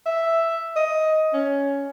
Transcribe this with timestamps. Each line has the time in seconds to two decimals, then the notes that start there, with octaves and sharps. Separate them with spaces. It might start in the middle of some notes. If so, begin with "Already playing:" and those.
0.06 E5
0.76 D#5
1.34 C#4